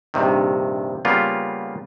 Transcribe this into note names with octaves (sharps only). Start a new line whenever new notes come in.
A#1 G2 C3 D#3
C#3 G3 A#3 B3 F4